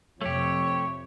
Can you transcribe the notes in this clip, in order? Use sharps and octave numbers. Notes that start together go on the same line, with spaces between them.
F2 C3 F3 A3 G4 C#5